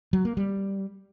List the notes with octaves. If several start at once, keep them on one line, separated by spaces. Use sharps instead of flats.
F#3
A#3
G3